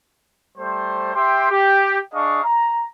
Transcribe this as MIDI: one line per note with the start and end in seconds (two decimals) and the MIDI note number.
0.58 1.12 55
0.58 1.12 57
0.58 1.12 72
1.15 1.49 67
1.15 1.49 76
1.15 1.49 79
1.15 1.49 84
1.50 1.98 67
2.14 2.43 62
2.14 2.43 68
2.14 2.43 75
2.14 2.43 77
2.14 2.43 85
2.44 2.85 82